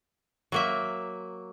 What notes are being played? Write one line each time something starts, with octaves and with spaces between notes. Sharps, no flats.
F#3 A#3 E5